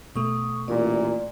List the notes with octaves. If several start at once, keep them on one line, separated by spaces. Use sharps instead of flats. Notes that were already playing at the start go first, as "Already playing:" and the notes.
B2 A3 C#6 D#6
A1 A#2 D5